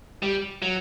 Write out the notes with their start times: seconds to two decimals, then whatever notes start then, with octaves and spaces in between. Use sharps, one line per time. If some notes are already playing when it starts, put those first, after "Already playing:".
0.23 G3
0.62 F#3